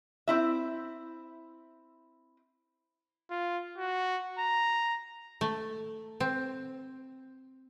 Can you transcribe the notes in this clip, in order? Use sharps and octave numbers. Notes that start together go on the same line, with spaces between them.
C4 E4 E5
F4
F#4
A#5
A3
C4